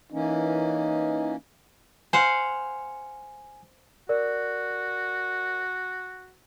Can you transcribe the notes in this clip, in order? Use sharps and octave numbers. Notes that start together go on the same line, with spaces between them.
E3 A#3 C#4 D#4
C5 F5 F#5 G#5
F#4 A#4 D5